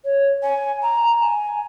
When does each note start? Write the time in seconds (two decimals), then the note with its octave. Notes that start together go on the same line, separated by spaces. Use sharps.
0.05 C#5
0.43 G#5
0.83 A#5
1.20 G#5